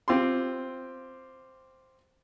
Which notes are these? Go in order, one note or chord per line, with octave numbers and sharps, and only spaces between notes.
C4 F4 G4 C6